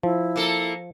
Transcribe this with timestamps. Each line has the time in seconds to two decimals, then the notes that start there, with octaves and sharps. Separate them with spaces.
0.03 F3 E4
0.36 A#3 A4